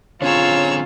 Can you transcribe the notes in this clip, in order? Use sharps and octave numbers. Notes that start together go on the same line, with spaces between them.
D3 C4 C#4 F4 G#4 C#5 A#5 E6